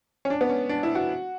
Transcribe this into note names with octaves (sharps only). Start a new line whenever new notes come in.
C#4
D4
B3
C#4
D4
E4
F#4